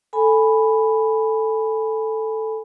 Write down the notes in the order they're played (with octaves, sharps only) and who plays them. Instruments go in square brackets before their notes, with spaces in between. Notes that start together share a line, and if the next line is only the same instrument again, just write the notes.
[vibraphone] A4 G#5 B5